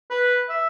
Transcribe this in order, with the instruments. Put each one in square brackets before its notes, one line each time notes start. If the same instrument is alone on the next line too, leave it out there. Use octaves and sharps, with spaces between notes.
[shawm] B4
E5